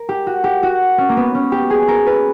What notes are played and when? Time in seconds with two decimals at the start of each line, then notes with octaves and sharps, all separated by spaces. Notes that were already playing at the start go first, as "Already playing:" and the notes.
Already playing: A#4
0.09 G4
0.27 F#4
0.44 G4
0.63 F#4
0.98 C#4
1.09 A#3
1.17 B3
1.35 C#4
1.52 G4
1.70 G#4
1.88 A#4
2.06 B4